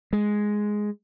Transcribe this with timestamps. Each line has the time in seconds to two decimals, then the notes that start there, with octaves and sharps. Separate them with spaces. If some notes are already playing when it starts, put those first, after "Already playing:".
0.13 G#3